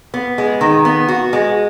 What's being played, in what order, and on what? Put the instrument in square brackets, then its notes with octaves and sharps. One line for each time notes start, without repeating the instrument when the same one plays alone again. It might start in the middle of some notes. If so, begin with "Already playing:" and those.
[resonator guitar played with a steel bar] B3
G#3
D#3
B3
F#4
G#3